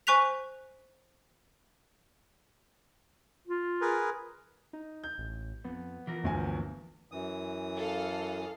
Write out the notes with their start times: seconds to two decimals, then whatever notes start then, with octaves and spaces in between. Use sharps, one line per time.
0.07 C5 G#5 C#6 F#6 B6 F7
3.47 F4
3.81 G#4 A#4 B4
4.73 D#4
5.04 G6
5.18 A1
5.64 F2 B3
6.07 E3 F3 A#4
6.23 G1 D2 G#5
7.12 F#2 E3 D#6
7.76 A4 F5